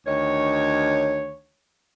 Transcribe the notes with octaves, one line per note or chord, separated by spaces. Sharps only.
D2 D#3 C#5